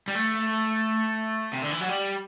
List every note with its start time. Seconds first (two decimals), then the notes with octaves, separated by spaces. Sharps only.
0.08 G3
0.15 A3
1.53 C3
1.62 D3
1.71 E3
1.81 F#3
1.89 G3